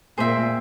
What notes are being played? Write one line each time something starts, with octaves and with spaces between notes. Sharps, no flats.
A#2 G#4 C5 E5 G5